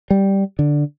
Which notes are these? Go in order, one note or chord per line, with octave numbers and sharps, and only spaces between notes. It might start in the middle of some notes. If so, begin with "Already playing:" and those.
G3
D3